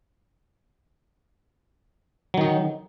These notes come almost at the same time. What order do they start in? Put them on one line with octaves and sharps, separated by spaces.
F#3 D#3 D#4